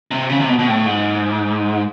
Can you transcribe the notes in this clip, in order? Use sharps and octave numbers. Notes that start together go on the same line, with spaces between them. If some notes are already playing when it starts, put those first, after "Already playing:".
C3
C#3
C3
B2
B2
A2
G#2